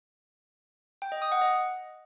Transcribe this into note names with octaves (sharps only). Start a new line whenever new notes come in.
G5
D#5
D#6
F#5
D#5